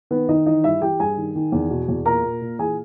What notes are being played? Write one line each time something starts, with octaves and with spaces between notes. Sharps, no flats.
D#3 B3 B4
D#3 D#4 D#5
E3 D#4 D#5
G2 E4 E5
E3 G4 G5
G2 G#4 G#5
D#3
D#3
E2
B2
E2
A#2 A#4 A#5
A#2
A#2
E3 G#4 G#5